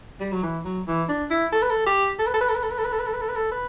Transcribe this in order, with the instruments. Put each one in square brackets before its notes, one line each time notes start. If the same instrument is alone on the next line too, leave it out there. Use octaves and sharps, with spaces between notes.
[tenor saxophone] G3
F#3
E3
F#3
E3
D4
E4
A4
B4
A4
G4
A4
B4
A4
B4
A4
B4
A4
B4
A4
B4
A4
B4
A4
B4
A4
B4
A4
B4